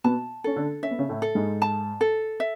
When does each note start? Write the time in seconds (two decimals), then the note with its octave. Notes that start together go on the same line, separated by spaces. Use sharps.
0.04 B2 B3 A5
0.44 C#4 A4
0.56 D3 D4
0.83 C#4 E5
0.91 B3
0.99 C#3 C#4
1.09 A2 A3
1.22 A4
1.35 G#2 G#3
1.62 A5
2.01 A4
2.40 E5